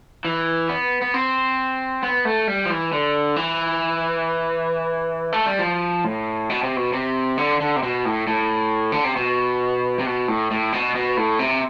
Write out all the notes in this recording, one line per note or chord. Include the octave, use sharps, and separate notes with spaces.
E3
B3
B3
C4
B3
A3
G3
F3
E3
D3
E3
A3
G3
F3
A2
B2
C3
B2
C3
D3
D3
C3
B2
A2
A2
D3
C3
B2
C3
B2
A2
A2
B2
B2
A2
C3